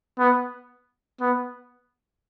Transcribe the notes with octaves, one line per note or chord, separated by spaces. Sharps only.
B3
B3